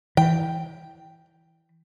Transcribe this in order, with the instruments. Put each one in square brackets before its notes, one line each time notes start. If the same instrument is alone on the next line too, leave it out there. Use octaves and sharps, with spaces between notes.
[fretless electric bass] E3 [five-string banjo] G5